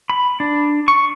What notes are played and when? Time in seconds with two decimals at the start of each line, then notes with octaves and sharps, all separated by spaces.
0.10 B5
0.40 D4
0.88 C#6